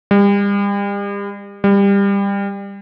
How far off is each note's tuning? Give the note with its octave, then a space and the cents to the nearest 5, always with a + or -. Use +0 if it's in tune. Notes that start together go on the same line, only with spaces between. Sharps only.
G3 +40
G3 +25